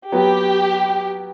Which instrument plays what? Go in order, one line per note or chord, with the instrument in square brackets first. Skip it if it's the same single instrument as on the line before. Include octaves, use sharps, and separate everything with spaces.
[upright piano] F#3 B3 F#4 B4 [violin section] G4